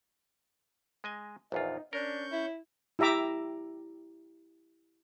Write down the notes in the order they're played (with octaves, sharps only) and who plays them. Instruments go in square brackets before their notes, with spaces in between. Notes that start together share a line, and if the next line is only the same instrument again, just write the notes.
[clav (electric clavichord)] G#3 D#5 G#5
[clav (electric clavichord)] A#1 E2 F4 [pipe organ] D#4
[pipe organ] C#4 C#6 G6 [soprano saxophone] D4 [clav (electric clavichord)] A#4
[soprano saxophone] E4
[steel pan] E4 G4 E5 A#5 D6